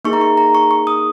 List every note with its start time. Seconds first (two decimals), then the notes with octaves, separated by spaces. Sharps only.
0.05 A#3 D#4 G#4 C#6
0.13 A#5
0.21 C#6
0.37 A#5
0.55 C#6
0.71 C#6
0.87 D#6